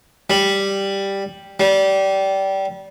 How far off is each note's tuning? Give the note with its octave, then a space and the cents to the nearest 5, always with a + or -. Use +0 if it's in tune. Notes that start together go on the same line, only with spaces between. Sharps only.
G3 +5
G3 -20